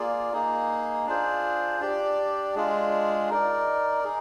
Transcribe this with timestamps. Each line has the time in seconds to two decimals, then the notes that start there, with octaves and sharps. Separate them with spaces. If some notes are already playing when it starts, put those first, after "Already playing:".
Already playing: A#3 F4 G#4 D5
0.33 A#3 D#4 G#4
1.06 D4 F4 G#4 C5
1.81 D4 G4 D5
2.55 G#3 D4 F4 G#4
3.30 D#4 A#4 D5
4.04 D#4 G#4